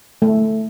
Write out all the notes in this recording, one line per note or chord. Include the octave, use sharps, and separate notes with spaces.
A3